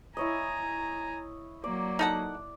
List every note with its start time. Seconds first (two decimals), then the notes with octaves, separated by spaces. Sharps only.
0.17 E4 C#5 D#5 G#5 A#5
1.64 F#3 A#3 D5
1.99 D#4 A4 F#5